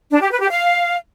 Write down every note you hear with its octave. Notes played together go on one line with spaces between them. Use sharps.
D4
G4
B4
G4
F5